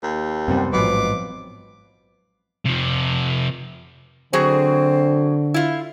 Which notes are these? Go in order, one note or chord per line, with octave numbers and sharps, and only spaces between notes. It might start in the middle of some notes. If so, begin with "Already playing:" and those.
D#2
F#2 C3 G3 B3 C4
A1 G#2 B2 F3 F#3 D6
C3 F3
D3 F#3 C4 F#4 G#4
E4 F4